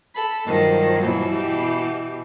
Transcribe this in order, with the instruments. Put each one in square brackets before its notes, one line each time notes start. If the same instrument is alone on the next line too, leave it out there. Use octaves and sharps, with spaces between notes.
[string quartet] A4 B5
[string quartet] G2 F3 F#3 [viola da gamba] D#3
[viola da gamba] B2 E3
[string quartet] G4